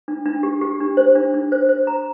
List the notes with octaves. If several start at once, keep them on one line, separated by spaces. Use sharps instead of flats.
D4
D4
G4
G4
D4
C5
D4
D4
C5
C5
A#5